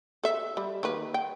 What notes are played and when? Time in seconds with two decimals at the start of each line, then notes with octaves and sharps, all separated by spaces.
0.24 A4 E5
0.57 G3
0.83 D#3 A#3 B4
1.14 G5